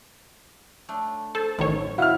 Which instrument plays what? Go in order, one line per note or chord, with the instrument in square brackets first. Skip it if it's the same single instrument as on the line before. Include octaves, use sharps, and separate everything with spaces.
[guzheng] A3 D4
[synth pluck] A4 [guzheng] C5
[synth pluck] A1 D#3 C#5 [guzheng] F#2
[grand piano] E4 F6 [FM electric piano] F#4 F5 F#5 [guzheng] D#5